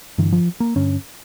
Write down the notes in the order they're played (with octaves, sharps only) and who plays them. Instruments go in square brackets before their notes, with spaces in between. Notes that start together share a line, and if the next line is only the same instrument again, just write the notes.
[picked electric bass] G2 D3 E3
F3
A#3
G2 D3 C#4